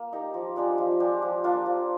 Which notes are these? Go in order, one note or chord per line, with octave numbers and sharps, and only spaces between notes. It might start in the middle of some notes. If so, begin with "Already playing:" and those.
Already playing: A#3
D#4 G4 A#4
F3
G#3 D4 G4
F3
G#3 D4 G4
F3
A#3 D4 F4
F3